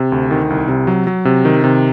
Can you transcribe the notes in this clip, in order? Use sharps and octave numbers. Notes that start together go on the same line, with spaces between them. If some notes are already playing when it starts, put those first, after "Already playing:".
Already playing: C3
D2
D#3
C2
C3
F#3
F#3
C3
D#3
C3